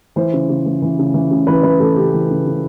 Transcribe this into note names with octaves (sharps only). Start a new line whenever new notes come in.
E3 C5
C#3
C#3
E3
E3
C#3
E3
C#3
E3 B4
E3 B4
E3 A4
C#3 G4
E3
C#3
C#3